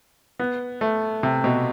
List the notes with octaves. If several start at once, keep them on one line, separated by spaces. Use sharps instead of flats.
B3
A3
C3
B2